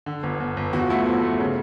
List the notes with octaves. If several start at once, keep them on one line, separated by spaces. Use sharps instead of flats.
D3
G1
G1
G1
E2 F#4
F4
A3 E4
F4
F3
A3
C#3